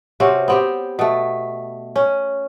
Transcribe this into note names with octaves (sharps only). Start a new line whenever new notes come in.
C3 C4 C#4 F#4
B3 C4 G4
B2 A3
C#4